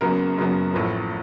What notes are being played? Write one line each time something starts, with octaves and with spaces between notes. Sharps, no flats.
F#1 F#2 C#3 F#3 B3 A#4
F#1 F#2 C#3 F#3 B3
A1 A2 F3 B4